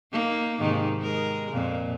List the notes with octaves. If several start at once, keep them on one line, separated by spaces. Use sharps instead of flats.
A#3 D#4
G#2 C3 D#3
G#3 A#4
F2 A#2